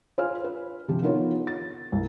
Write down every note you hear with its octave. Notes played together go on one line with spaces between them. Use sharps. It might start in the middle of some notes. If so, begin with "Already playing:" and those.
F4 C5 C#5 F5 G#5 F6
B4
C3 F3 G4
B3 D#4 F4 A#4 B4 C#5
A6
C2